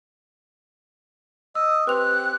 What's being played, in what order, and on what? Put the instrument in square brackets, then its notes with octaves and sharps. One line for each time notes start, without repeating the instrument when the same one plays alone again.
[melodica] D#5 D#6 [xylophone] E6
[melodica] C4 G4 [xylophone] B4 C6 F7 [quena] F#6